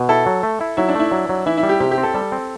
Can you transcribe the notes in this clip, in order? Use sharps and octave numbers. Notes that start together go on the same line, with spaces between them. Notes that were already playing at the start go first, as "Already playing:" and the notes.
Already playing: B2
E4 A4
F#3
A3
E4
F#3 E4
D4
A3 E4
F#3
F#3
E3 E4
E4
G3
G4
C3 G4
G4
C4
A4
G3 A4
C4